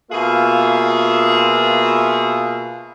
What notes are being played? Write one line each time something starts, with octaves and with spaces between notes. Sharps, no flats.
B2 A#3 F4 G#4 E5 F5